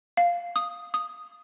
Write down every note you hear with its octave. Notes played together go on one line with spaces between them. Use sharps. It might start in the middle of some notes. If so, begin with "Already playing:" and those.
F5
D#6
D#6